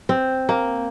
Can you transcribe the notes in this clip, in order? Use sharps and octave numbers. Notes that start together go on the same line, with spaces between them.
C4
A#3